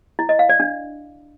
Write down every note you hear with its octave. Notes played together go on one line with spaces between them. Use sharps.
E4
D#5
F5
D5
D4